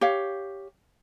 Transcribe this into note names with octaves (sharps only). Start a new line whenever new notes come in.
G4 C#5 F5